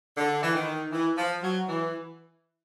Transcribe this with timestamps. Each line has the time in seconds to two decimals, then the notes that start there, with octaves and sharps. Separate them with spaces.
0.17 D3
0.43 E3
0.55 D#3
0.92 E3
1.18 F3
1.43 F#3
1.68 E3